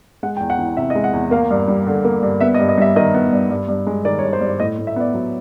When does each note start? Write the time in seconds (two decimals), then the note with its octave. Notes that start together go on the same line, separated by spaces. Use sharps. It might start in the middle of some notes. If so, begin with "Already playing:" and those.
0.23 G#3 F#5
0.37 G5
0.40 E2
0.50 F#5
0.58 E3
0.77 C3 E5
0.90 D#5
0.95 G#3
1.04 F#5
1.13 E2
1.31 A#3 F5
1.51 G2
1.68 G3
1.87 D3
2.05 A#3
2.23 G2
2.41 B3 E5
2.55 D#5
2.59 G2
2.69 D#5
2.78 G3 E5
2.96 D#3 D#5
3.14 B3
3.33 G2
3.50 G2
3.69 G2
3.87 G#3
4.05 D#3 D5
4.19 C#5
4.23 G2
4.33 C5
4.41 G2
4.47 D5
4.60 A2 D#5
4.78 A2
4.87 E5
4.96 B3 D5
5.14 F#3